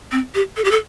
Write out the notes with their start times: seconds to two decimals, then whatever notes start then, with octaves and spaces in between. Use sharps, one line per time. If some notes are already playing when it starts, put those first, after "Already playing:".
0.12 C4
0.35 G4
0.57 A4
0.64 G4
0.71 A4